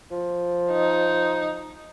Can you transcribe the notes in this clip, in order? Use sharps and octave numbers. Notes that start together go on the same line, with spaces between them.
F3
D#4